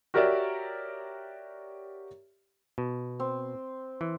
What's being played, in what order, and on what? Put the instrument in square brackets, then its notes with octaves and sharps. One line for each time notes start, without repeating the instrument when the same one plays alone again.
[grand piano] F#4 G4 A#4 C#5 D5 E5
[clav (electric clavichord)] B2
[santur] C4
[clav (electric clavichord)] E3